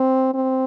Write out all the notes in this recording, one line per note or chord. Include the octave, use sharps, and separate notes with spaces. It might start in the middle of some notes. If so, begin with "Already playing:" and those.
Already playing: C4
C4